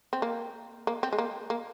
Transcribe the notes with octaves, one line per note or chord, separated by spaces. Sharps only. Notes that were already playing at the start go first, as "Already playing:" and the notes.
C4
A#3
A#3
C4
G#3
A#3
A#3